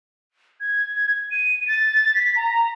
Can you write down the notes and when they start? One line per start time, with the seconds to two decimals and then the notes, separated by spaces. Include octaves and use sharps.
0.60 G#6
1.31 D#7
1.67 A6
2.15 B6
2.36 A#5